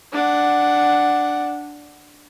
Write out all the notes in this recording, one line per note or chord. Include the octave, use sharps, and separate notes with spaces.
D4 F#5